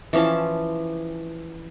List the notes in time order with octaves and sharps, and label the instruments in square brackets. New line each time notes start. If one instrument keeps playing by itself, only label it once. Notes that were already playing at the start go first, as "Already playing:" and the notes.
[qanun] E3 F3 C#4 A5